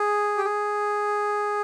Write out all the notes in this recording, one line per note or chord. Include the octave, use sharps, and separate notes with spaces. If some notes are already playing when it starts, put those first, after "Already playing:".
Already playing: G#4
G4
G#4